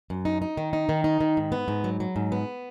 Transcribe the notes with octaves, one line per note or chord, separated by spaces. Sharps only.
F#2
D#4
D#4
D#3
D#4
D#3
D#4
D#3
G#2
B3
G#2
F#3
F#3
G#2
B3